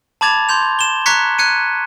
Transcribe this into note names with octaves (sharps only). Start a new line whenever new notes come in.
A5 B5 D6 G#6 A6 F7
C6 G6 F7
E7 G7
A#5 C#6 F#6 G#6 B6 C#7
F#6 G#6 C#7 D#7